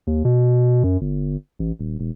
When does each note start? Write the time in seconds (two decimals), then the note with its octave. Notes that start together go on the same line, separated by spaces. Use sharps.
0.07 D#2
0.25 B2
0.83 F#2
1.01 G1
1.59 A1
1.79 D#1
2.00 E1